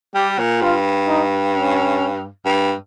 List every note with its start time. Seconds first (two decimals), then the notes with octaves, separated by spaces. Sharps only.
0.15 G3 G4
0.39 A#2
0.61 G2 F4
1.08 D#4
1.53 C#4
2.46 G2